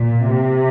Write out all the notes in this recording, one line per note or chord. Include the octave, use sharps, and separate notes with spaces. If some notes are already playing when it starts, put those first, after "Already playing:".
Already playing: A#2
C3